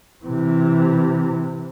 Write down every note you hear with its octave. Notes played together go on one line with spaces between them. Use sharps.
C3 E3